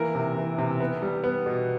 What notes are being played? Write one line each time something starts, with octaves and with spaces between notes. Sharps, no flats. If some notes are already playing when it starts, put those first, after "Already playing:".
Already playing: E3 A#3 A#4
C3
E3
C3
B3
G3
B3
B2